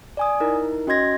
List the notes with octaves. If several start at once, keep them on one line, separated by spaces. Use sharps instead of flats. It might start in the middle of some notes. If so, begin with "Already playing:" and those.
D5 G#5 D#6
D#4 E4 A#4
C#4 F#4 D#5 C6 G#6 A#6